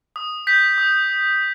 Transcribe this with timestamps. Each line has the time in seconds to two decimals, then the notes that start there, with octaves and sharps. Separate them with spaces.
0.16 D#6
0.47 G6 B6
0.78 D#6